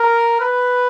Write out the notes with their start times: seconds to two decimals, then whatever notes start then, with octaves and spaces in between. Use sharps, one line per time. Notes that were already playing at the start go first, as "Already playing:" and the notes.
Already playing: A#4
0.41 B4